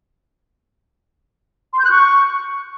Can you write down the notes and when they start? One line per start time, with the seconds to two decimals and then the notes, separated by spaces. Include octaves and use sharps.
1.73 C6
1.79 G6
1.85 F#6
1.91 C#6